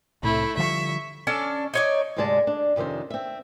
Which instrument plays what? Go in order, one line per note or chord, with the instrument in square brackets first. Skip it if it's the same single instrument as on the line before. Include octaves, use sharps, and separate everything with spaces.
[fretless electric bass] C2 A2 C3 [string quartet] A3 E4
[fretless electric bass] D3 F3 G3 [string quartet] E5 C#6
[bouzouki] C#4 D4 A4 D5
D#4 C#5 D5
[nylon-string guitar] D2 G#2 C3 G#3 D5 A5
D4
F2 C3 D#3 C#4 C5
C4 E5